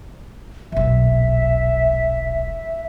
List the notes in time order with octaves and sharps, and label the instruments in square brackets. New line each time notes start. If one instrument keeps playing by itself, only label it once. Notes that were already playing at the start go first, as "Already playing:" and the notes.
[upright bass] D#1 B1 [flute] E5